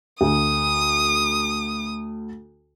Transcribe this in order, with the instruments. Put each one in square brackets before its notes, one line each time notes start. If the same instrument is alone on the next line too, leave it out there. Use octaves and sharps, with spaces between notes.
[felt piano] D2 [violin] D#6